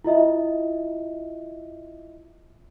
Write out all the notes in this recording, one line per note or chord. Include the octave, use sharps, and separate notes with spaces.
E4 F4 D#5 E5